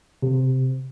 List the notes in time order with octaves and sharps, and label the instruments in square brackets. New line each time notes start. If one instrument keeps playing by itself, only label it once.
[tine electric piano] C3